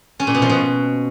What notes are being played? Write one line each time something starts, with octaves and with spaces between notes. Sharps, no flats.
C#4
A#2
B2
F3
B2